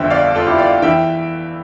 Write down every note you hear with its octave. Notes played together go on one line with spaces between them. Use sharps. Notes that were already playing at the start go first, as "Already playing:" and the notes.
Already playing: G1 F2 D3 E5 G5
D5 F5
F4 A4
E4 G4
D5 F5
E3 E5 G5